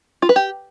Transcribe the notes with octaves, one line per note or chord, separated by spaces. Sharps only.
F4
B4
G4